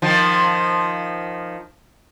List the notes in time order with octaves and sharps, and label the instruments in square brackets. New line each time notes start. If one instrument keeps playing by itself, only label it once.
[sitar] D#3 F3